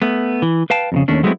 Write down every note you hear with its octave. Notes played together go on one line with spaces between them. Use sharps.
A3 B3
E3
B4 F5 G5 A5
F2 A#2 C#3
D#2 A3 C#4 D4
F#3 G#3 A3 B3 C4 E4